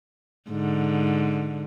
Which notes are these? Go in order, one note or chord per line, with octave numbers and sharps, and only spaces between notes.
G#2 D3